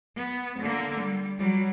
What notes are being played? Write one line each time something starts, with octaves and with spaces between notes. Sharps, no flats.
B3
D3 A#3
G3
F#3 G3